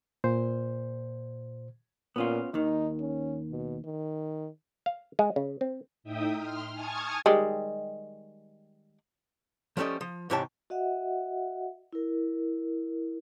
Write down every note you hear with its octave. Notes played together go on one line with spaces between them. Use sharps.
A#2 C5
A#2 B3 C#4 F4
D#2 D#3 D#4
C#4
B2
D#3
F5
G#3
C#3
C4
A2 D#4 E5 G5 D#6
C6 F6
G#5 A5 C#6 D#6 F6 G#6
D#3 G3 G#3
F3 G3 A3 C#4 A4 D#5
F3
G#2 C3 E3 G4 C#5 A5
F#4 D#5 E5 F#5
E4 A#4